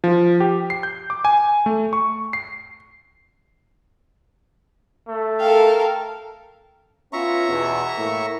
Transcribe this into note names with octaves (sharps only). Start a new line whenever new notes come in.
F3
G4
C7
G6
D6
G#5
A3
C#6
C7
A3
A4 A#4 F5 G5 A5
B3 C#4 F4 E5 A#5 C#6
E2 B2
A2 A#3